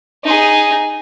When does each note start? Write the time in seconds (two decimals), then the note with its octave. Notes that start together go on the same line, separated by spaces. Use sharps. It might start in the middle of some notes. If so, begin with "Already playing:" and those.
0.24 D#4 G#4